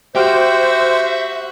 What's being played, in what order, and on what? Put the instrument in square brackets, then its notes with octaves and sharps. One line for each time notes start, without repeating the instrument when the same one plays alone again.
[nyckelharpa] F#4 [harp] G4 G5 F6 [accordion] C5 [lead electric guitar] E5